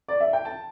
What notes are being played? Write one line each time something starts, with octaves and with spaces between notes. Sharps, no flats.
D5
E5
G5
A5